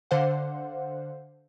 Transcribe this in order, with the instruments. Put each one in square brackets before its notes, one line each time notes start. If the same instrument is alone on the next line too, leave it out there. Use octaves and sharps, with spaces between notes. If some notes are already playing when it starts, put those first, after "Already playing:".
[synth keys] D3 C5 F5 F#5